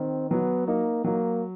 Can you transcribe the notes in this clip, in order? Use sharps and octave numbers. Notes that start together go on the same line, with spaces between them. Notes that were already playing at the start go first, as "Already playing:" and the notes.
Already playing: D#3 C4
F#3 B3
A#3 D#4
F#3 A#3